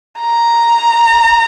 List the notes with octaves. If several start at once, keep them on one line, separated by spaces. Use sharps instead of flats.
A#5